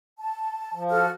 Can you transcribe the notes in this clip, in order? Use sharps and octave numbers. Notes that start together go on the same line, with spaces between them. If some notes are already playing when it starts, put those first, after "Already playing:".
A5
F3
F#4 A4 F6